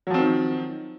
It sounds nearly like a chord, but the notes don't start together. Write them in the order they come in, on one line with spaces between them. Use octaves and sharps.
F#3 F3 C4 D#3